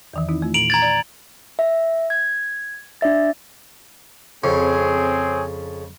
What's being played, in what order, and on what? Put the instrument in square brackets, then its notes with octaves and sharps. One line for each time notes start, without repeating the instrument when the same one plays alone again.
[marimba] E2 D#3 E3
C4 D#4 E4
A3 F4
[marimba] A#2 [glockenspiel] D7 F7 F#7
[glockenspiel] A#5 G#6 A6
[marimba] D5
[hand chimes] E5
G#6
D4 D5 E5 A6
[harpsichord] F2 C#3 [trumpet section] C4 G#4 C#5